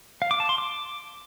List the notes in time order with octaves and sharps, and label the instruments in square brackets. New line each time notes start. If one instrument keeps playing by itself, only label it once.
[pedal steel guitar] F5
D6
A5
C6
D6